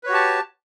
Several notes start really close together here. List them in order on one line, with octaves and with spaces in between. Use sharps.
B4 C#5 F#4 G4 A5